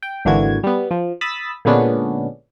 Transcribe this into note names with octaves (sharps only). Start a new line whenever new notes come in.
G5
G#1 D3 E3 A#3 F#4 G#6
G3 B3
F3
B5 D#6 E6 A6 B6
A#2 D3 G#3 B3 C#4 D4